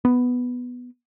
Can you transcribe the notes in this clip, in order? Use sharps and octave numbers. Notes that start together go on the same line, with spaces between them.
B3